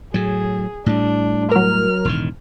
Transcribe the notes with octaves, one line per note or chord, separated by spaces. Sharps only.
A2 F#3 G#4
A2 G3 D4
F#3 A#4 F6
E1 A2 D#3